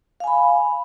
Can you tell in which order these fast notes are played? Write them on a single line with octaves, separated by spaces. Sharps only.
F5 G#5 B5